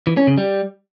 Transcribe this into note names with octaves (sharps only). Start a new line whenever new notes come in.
E3
C#4
C#3
G3